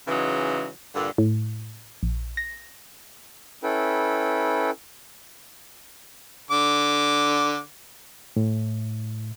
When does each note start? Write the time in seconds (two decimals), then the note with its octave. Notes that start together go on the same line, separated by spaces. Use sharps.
0.07 C#3 E3 F#3 G#3 D#4
0.94 G2 A#2 D3
1.18 A2
2.03 A#1
2.37 A#6
3.63 C#4 E4 A4 B4 G5
6.51 D3 D6
8.36 A2